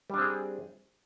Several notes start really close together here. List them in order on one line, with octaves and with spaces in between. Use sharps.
G3 D4 C4 G#4